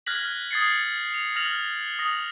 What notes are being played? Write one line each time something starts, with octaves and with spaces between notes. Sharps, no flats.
F6 F#6 G#6 A#6 B6 F#7
D#6 G#6 A6 C7 C#7
F7
F6 A#6 F7 F#7
D#6 A#6